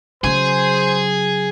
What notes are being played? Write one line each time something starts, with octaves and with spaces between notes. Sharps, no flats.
C#3 F#3 G#4 C5